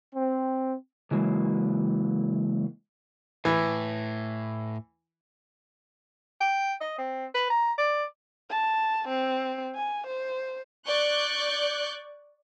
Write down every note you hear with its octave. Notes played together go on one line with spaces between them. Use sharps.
C4
C#3 E3 F#3 G#3 A#3
A2 E3
G5
D#5
C4
B4
A#5
D5
A5
C4
G#5
C5
D5 C#6 F#6 G6